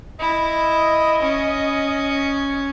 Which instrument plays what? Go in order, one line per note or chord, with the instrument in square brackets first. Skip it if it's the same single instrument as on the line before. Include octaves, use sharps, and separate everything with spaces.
[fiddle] E4 [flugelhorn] D#5
[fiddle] C#4